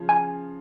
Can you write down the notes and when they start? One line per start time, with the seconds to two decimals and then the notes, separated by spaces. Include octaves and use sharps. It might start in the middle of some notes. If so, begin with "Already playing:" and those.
Already playing: C#3 F3
0.09 G#5